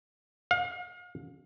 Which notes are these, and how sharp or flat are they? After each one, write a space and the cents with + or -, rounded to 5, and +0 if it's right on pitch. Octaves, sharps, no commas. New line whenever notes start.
F5 +40